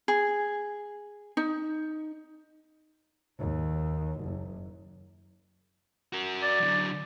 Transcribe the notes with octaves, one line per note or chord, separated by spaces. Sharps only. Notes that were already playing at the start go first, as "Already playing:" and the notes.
G#4
D#4
D#2
F#1
F#4 A#4
D5
D3 F#3